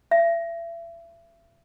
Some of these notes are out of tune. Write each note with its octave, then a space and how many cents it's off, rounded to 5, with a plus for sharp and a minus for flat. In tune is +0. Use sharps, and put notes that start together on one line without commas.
E5 +35